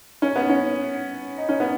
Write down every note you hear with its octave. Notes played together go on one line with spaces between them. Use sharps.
C#4
B3
C#4
D#4
C#4
B3